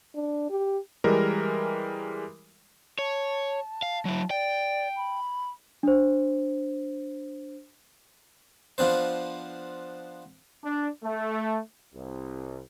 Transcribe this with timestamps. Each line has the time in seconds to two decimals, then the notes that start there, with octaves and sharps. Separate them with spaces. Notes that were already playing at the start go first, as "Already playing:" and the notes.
0.15 D4
0.50 G4
1.04 E3 G3 G#3 A#4
2.99 C#5 A5
3.82 F5
4.05 F#3 E4
4.30 D5 G5
4.96 B5
5.83 D4 C5
8.78 F3 B3 D4 C5
10.64 D4
11.04 A3
11.95 C2